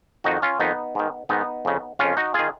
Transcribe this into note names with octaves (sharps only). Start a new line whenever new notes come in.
F2 D#3 D#4 F#4
C#4 F4
F2 D#3 B3 D#4
G#2 D#3
G#2 D#3 B3 D#4
F2 C#3
F2 C#3 C#4 F4
D#4 F#4
D#3 F4 G#4